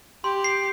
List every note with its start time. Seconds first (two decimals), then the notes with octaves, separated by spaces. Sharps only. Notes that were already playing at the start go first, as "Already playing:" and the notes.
0.24 G4 C6
0.44 C7